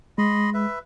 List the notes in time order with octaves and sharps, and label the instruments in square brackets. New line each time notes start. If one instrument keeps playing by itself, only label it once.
[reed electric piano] G#3 [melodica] D#5 B5 C6
[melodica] B4 E5